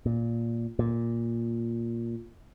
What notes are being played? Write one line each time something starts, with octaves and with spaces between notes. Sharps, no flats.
A#2
A#2